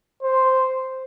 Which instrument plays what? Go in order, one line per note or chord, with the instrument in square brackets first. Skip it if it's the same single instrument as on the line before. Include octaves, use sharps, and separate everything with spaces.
[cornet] C5